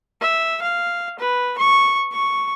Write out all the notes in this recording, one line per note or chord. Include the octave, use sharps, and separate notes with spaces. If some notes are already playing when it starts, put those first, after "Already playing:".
E5
F5
B4
C#6
C#6